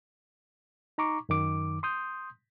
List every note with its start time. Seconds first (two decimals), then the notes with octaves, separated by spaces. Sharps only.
0.98 D#4 A#5 C#6 D6
1.29 F#2 D#3 D6
1.83 C6 D#6 G6